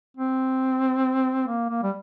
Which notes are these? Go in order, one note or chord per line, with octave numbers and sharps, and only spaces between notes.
C4
A#3
A#3
G3